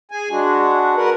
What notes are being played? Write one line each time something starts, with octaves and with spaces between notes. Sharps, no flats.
G#4 G#5
G#3 D4 F#4
F#4 A#4 B4 F#5